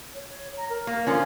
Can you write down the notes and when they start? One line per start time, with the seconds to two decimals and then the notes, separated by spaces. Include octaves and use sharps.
0.14 C#5
0.57 A#5
0.70 A#4
0.87 A#3
1.07 D3 F3 C#4 A#4